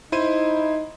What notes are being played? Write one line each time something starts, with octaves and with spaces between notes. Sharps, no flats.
D#4 E4 C5 D#7